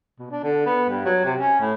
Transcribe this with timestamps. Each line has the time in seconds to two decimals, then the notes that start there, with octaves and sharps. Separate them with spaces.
0.19 B2
0.31 D4
0.43 D3
0.66 B3
0.89 G2
1.05 F#3
1.24 C3
1.39 C#4
1.60 A2